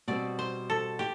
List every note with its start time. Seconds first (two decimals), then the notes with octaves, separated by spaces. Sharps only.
0.08 B2 G3 C4 D5
0.39 C5
0.70 A4
0.99 G4